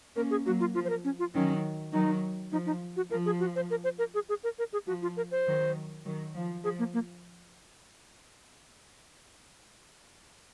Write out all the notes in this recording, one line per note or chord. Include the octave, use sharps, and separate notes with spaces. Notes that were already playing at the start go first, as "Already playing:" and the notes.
A#3 C#4 A#4
G#4
F#3 A#3 F#4
F4
F3 F4
C5
A#4
C#4
F4
D#3 F#3 C#4
D#3 F#3 D#4
F3 D#4
D#4
F#4
F3 A#4
G#4
F#4
C5
A#4
C5
A#4
G#4
G#4
A#4
A#4
G#4
F3 F#4
F4
A#4
C5
D#3 F#3
D#3 F#3
F3
F3 G#4
A#3
A#3